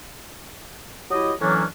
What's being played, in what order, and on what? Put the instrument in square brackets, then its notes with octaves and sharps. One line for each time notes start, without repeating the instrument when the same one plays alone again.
[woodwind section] F#3 E4 G4 D#5
A2 E3 F#3 A#3 C#4 D4